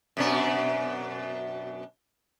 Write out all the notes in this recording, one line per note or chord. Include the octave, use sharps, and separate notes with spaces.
F#2 B2 D4